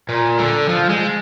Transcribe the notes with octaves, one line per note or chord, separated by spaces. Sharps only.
A#2
D3
F3
G#3